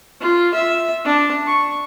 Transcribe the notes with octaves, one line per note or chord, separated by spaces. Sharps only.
F4
E5
D4
C#6